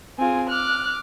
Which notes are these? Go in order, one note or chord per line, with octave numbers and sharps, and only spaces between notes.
C4 F4 G#4 G#5
D6 F6 F#6